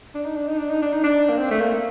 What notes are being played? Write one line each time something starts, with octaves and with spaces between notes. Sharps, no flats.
D4
D#4
D4
D#4
D4
D#4
D4
D#4
D4
A#3
C4
A3
A#3